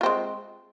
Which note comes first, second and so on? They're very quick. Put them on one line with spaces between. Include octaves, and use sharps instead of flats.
F4 C4 G#3